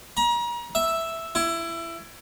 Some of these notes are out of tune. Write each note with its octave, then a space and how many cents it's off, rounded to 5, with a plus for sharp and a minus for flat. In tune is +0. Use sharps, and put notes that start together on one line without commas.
A#5 +35
E5 +0
E4 +20